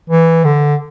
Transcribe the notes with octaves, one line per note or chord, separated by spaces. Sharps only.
E3
D3